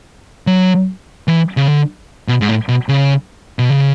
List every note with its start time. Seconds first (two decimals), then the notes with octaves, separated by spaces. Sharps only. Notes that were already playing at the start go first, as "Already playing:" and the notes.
0.47 F#3
1.28 E3
1.57 C#3
1.68 D3
2.28 B2
2.41 G#2
2.49 A2
2.69 B2
2.89 C#3
3.59 B2
3.70 C#3